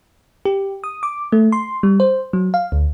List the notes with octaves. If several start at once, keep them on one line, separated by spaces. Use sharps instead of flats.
G4
D#6
D6
A3
C6
G3
C5
F#3
F5
D2